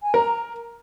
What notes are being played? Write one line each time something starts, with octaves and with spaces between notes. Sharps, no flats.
G#5
A#4 A#5